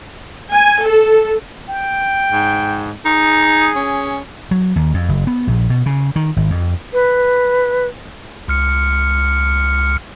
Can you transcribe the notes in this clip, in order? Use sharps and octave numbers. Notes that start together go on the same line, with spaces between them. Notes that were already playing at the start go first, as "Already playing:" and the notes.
G#5
A4
G5
G#2
D#4 G#4
C#4
F#3
D#2
F2
F#1
B3
A#1
B2
C#3
D#3
G#1
F2
B4
C#2 F6 C#7